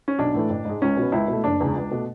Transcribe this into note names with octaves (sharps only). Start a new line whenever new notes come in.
C#4
B1 D4
A2 E3 A3
A1
G#2 G#3
C#2 C#4
B2 F#3 B3
C#2 E4
B2 A3
F#1 D4
E2 C#3 G#3
C#2
B2 A3